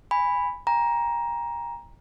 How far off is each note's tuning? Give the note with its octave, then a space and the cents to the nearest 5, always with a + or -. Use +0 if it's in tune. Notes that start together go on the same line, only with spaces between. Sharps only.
G#5 -15 B5 +0
G5 +45 A#5 +15